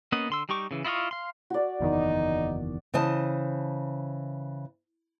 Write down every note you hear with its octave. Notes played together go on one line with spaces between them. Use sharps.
A#3 B3 C#4 D#5 F#5
D3 C6 E6
G3 D#4 G4 C#6 D6
C#3 E3
E4 F4 D#5 F5 C#6
F5 C6
F#4 D5
F#1 E2 D#3 D#4
C#3 E3 C5 D#5 A5